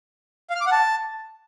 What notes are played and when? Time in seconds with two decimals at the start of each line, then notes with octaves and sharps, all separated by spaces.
0.50 F5
0.55 F6
0.61 D6
0.66 F#5
0.72 A5